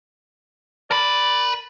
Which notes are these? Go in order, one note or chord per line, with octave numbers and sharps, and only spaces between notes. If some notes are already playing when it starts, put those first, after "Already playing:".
A#4 D5 B5